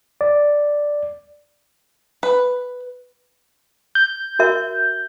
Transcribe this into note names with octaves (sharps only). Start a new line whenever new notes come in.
D5
B4
G6
F#4 A#4 E5